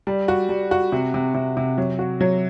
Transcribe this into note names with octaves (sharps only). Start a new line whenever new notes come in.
G3
F#4
G3
F#4
C3
C3
C3
C3
F#3
F#4
F#3